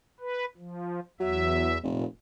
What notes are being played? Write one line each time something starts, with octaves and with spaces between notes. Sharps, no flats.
B4
F3
E2 F#3 E5
F1 A#2